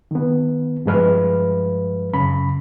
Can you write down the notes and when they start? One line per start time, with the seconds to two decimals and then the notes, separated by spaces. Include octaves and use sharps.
0.11 D#3 B3
0.86 G2 F3 G#3 B4 F6
2.13 F#2 C#3 B5